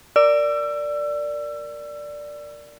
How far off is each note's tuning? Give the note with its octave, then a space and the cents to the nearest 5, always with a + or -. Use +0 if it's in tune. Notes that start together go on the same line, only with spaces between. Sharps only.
A#4 -5 D5 +0 E6 +30